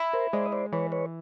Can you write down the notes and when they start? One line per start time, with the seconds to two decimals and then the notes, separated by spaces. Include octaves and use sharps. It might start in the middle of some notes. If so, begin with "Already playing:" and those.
Already playing: E4
0.13 A#4 C5
0.33 G#3 C5 D5
0.46 D#5
0.52 C5 D5
0.72 E3 B4 C#5
0.92 B4 C#5